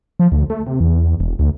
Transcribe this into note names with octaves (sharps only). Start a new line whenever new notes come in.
F3
D2
A3
C3
E2
E1
D2